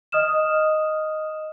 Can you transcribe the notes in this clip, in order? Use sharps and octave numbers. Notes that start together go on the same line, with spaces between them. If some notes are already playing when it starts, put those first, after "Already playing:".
D#5 D#6 F6 E7